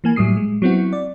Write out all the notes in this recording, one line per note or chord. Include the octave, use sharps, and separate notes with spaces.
E3 A#3 G#5
A2 F#3 G3 D#6 C7
G#3
F#3 B3 C4 E4 F#4
D5